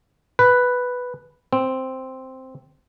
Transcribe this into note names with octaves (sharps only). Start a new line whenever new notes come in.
B4
C4